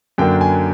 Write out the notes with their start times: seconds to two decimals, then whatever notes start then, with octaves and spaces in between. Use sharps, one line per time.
0.18 F#2 D3 F#3 A#3 D4 G5
0.41 G#5